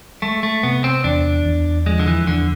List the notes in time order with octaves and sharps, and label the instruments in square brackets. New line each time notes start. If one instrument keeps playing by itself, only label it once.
[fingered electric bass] G#3 [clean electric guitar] A3
[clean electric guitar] A3
[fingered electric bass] C3 [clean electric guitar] B3
[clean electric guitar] C4
[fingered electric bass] E2 [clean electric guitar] D4
[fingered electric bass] E2
[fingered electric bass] F3 [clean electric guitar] G#3
[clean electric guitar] D3
E3
[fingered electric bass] E2 [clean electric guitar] D3